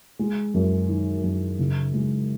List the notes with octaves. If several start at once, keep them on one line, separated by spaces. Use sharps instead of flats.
G#3
F#2
D#3
F#2
C#3
G#3